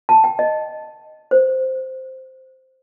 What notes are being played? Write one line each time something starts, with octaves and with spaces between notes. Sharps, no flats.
A5
G5
D#5
C5